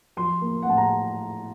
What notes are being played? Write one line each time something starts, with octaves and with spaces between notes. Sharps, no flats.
F3 C6
A#3
F#5
A2 A5
A#5